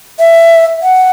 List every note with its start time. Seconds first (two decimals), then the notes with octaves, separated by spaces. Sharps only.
0.19 E5
0.83 F#5